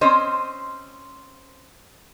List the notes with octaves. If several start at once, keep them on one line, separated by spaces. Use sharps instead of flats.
C4 C#4 C5 D#5